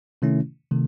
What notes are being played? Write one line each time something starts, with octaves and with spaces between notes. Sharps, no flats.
C3 D#3 A3 C#4 E4
C3 D#3 A3